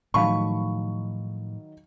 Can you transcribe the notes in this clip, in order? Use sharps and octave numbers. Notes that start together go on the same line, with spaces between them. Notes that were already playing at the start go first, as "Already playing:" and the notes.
A2 D#3 F3 F#3 F5 A5 B5 C#6